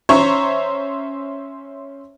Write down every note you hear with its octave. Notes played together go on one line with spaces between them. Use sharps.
C#4 C5 C#5 E5 A#5 C#6